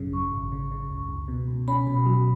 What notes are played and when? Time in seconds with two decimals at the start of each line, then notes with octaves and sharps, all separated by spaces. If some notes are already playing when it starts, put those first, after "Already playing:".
Already playing: G#1 F#2 C#3
0.13 F#2 C#6
0.32 G#1
0.52 C#3
0.71 C#3
0.90 C#2
1.09 C#2
1.28 B2
1.48 C#2
1.68 C#4 B5
1.87 B2
2.06 F#3